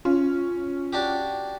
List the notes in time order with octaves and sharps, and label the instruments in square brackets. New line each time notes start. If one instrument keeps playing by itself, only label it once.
[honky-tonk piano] C#4 [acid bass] F4
[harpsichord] D4 F#4 G4